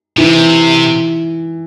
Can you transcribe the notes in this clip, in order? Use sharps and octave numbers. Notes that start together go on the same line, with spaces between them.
C3 E3